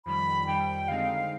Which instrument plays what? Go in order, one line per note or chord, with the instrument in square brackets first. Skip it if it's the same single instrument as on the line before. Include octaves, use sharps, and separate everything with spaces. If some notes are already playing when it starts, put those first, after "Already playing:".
[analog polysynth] F2 D#3 G3 [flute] B5
[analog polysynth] F2 D#3 G3 [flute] G5
[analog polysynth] D3 G#3 C4 D#4 [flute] F5